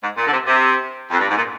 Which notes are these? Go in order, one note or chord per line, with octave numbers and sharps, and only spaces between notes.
G#2
A#2
D3
C3
C3
F2
G2
G#2
A#2